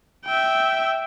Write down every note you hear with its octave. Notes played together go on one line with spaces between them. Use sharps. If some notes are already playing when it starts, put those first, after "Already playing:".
E5 G5